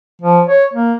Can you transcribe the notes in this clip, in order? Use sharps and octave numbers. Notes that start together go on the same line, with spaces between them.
F3
C#5
A#3